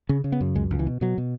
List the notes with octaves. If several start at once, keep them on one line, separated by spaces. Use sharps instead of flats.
C#3 C#4
C#3
B3
F#2
C#2 G#3
C#2
E3
B2
B2 F#3
B2